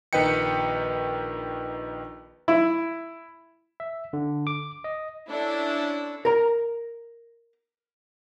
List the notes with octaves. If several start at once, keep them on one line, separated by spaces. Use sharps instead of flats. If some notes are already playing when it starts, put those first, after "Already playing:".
A#1 D#3 B4 D#5 G5 C#7
E4
E5
D3
D6
D#5
C#4 D4 E4 A4
A#4 A#5